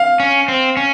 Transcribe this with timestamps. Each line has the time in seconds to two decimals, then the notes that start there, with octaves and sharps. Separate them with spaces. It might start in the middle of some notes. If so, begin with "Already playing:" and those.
Already playing: F5
0.20 C#4
0.48 C4
0.77 C#4